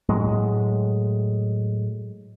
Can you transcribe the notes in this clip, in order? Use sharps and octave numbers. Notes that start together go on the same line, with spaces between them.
A2 F#3 G#3